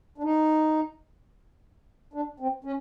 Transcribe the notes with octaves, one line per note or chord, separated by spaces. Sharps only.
D4
D#4
D4
C4
C#4